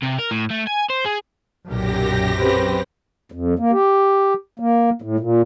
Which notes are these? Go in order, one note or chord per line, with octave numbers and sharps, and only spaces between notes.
C3
A#4
A2
A3
G#5
C5
G#4
B1 F#2 A#2 G4 A#6
C4 B4
F2
A#3
G4
A#3
A2
A#2